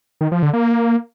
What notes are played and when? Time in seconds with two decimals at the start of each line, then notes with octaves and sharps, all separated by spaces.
0.21 D#3
0.32 F3
0.43 D3
0.53 A#3